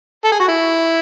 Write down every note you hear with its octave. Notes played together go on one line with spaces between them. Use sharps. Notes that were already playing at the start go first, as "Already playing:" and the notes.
A4
G#4
F#4
E4